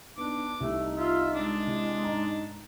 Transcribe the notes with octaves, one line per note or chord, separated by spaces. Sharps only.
B3 D4 D#4 D6
C2 A3 D#4
F4 E5
G#3 D4
C3 E4
G#2 D#4 A#5